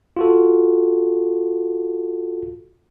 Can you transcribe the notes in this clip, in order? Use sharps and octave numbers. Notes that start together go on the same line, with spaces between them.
F4 F#4 A4